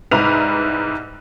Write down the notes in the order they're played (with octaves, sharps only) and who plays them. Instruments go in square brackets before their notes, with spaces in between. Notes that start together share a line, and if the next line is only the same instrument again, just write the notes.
[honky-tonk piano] C2 G#2 B4 A#5 B5 F7